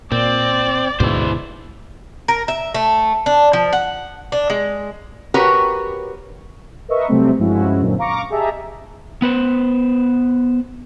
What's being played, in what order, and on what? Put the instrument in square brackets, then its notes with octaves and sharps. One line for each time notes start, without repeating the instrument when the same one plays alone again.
[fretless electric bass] A#2 [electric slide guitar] C4 [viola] D5
[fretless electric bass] D2 G#2 B2 [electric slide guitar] E4 C5
[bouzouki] A#4
E5
A3
D4
F3
F#5
D4
G#3
[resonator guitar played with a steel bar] C#4 F#4 G4 A#4 B4
[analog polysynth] A#4 B4 D#5 E5 C#6
C3 F#3 G3 A3 C4
G2 F3 G#3 C#4 E4 F#4
F#2 A#2 D3 F#3 C4
F5 A#5 C#6 D6 A#6 C#7
G4 G#4 D#5 E5 A5 A#5
[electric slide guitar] B3 B4 C5